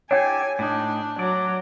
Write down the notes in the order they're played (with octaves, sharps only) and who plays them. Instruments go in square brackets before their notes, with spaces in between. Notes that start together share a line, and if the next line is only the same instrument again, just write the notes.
[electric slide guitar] D4 E4 G4 [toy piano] C#5 G5 [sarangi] G#5
[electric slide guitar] A2 D#4 [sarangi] D4
[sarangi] F#3 [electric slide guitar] D5